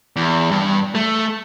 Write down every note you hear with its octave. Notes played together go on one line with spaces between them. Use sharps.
E2
G2
A3